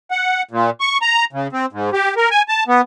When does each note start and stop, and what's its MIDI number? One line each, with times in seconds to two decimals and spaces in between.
0.11 0.42 78
0.51 0.70 46
0.81 0.98 85
1.02 1.25 82
1.33 1.47 49
1.53 1.66 60
1.72 1.90 44
1.93 2.14 67
2.17 2.29 70
2.31 2.42 80
2.49 2.64 81
2.68 2.81 59